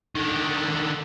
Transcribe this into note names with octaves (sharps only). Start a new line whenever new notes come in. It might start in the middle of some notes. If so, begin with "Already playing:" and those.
D3 D#3